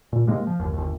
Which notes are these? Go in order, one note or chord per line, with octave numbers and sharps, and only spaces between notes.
A#2
G#2 C3 G#3 A#3
F3
G1 D#2
G1 D#2